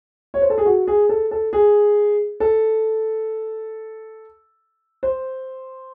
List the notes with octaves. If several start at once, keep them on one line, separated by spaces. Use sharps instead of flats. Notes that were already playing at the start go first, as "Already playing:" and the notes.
C#5
C5
A4
G#4
F#4
G#4
A4
A4
G#4
A4
C5